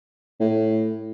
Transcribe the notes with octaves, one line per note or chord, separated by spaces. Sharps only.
A2